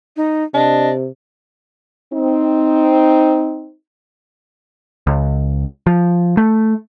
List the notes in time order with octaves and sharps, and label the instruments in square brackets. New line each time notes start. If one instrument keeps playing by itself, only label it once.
[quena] D#4
[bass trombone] C3 [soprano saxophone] D4 [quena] D#5
[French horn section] C4 D#4
[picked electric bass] C#2
F3
A3